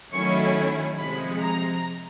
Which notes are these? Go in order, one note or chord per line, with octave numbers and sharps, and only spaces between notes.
D#3 F#3 A3 C#4 E4 C#6
C3 F3 G#3 B5
A#5